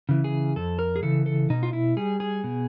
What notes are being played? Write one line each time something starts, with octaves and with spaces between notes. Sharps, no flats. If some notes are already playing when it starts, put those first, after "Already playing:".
C#3 E3
G#4
F2 A4
A#4
G#4
C#3 E3 A4
A4
B2 D#4
F4
E4
G3 G#4
G#4
B2